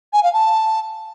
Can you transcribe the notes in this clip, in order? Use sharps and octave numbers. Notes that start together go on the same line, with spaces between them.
G#5
F5
A5